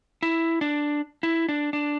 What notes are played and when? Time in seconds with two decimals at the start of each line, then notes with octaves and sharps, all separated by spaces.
0.23 E4
0.61 D4
1.23 E4
1.49 D4
1.73 D4